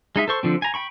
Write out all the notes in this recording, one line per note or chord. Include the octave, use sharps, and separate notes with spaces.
G#3 D#4 E5
A4 C5 C#6
D3 F3 C4
G#5 A#5
G5 B5 C#6